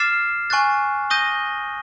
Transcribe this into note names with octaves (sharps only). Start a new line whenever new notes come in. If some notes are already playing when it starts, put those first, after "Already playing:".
Already playing: D6 F6 A6 C7 E7
G#5 C#6 F#6 A6
D#6 G6 A#6 D#7 G7